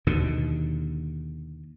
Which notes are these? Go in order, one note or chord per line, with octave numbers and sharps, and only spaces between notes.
D#2 B2 D3